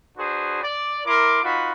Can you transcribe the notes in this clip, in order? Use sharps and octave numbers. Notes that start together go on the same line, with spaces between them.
D4 F#4 G#4 B4 C5
D5
E4 A#4 C6 D6
D#4 F4 F#4 B4 B5